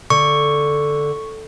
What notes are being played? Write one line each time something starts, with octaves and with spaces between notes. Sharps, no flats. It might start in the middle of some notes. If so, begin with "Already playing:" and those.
D3 C#6